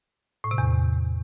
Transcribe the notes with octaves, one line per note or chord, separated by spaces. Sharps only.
A2
C3
E2